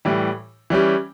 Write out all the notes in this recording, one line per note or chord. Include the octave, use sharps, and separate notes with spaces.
A2 E3 G3
E3 G3 C#4 G4